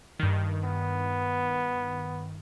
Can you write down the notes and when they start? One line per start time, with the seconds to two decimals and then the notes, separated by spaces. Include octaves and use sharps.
0.19 G2 D#3
0.64 B3